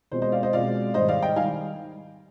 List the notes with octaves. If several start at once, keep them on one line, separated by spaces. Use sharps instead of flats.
B2 G#3 C4 F4 C5
C5 D#5
D5 F5
C5 D#5
B2 G#3 C4 F4 D5 F5
G#2 D#3 G3 C5 D#5
D5 F5
D#5 G5
D#3 G3 F5 G#5